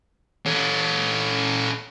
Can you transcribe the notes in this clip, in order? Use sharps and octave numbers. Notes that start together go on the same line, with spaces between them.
C#4 A4